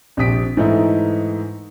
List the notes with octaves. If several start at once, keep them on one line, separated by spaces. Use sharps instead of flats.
A#1 C3 G4 D#6 B6 D7
G#2 E3 A3 D#4 E4